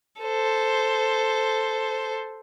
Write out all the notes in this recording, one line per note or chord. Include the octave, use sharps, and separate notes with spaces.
A4 C5